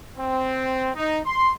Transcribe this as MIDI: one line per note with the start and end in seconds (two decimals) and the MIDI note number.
0.18 0.90 60
0.96 1.20 63
1.26 1.52 84